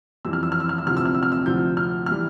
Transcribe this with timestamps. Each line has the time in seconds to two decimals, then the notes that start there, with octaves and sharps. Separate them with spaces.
0.25 F2 E3 G3 E6
0.33 F6
0.43 E6
0.52 F6
0.60 E6
0.69 F6
0.78 E6
0.86 D2 C3 F3 F6
0.97 E6
1.05 F6
1.15 E6
1.23 F6
1.32 E6
1.46 D2 C3 F3 G6
1.77 F6
2.06 E3 G3 F6